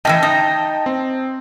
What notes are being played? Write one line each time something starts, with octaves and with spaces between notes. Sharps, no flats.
A2 C#3 E3 D#5 G5 A5
D#4
C4